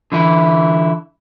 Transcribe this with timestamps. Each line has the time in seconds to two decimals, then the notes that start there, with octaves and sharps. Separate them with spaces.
0.12 D3 E3 E4